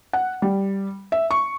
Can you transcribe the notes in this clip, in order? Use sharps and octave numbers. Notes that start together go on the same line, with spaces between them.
F#5
G3
E5
C#6